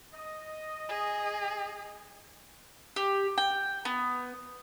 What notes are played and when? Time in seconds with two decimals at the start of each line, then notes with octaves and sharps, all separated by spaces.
0.14 D#5
0.89 G#4
2.96 G4
3.38 G5
3.85 B3